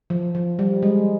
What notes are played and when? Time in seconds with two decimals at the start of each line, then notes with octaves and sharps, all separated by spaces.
0.10 F3
0.35 F3
0.59 G3
0.83 G#3